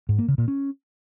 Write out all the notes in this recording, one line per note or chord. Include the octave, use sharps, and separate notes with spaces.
G#2
A#3
C#3
A#2
C#4